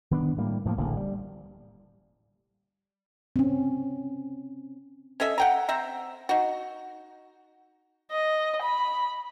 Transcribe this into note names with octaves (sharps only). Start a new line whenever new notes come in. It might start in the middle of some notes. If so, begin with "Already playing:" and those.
D#3 B3 D4
A2 G3 A#3
A2 F3 G#3 A#3
D1 A1 D3 A#3
G3
C4 C#4
C#4 A4 D#5 E5
F#5 G5 A#5
C4 E5 A#5
D#4 F#4
D#5
B5